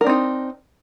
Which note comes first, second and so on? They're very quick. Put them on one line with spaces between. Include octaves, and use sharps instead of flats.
A#4 D4 C4 D#4